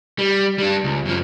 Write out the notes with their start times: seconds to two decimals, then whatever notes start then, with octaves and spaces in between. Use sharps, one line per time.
0.19 G3
0.58 G3 D4
0.84 C#2
1.05 F#2 F3